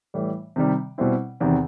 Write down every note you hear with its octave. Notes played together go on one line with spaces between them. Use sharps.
A2 E3 G3
C3 D#3 G3
B2 G3 C4 E4
E2 C3 D#3